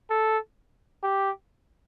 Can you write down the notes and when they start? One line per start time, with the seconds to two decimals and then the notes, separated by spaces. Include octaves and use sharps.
0.10 A4
1.03 G4